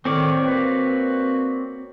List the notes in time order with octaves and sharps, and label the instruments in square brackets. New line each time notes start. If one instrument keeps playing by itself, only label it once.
[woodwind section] A2 D#3 [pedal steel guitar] C4 C#5 D5
[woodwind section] A#3 F#4 B4